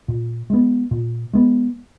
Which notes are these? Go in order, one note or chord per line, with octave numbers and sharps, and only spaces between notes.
A#2
G#3 B3
A#2
G#3 B3